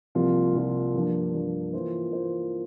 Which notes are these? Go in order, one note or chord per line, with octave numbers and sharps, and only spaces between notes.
C2 C3 F3 A#3 F4
C2 C3 F3 A#3 F4
G2 F3 A#3 D4
G2 F3 A#3 D4
E3 A#3 F4 C5
E3 A#3 F4 C5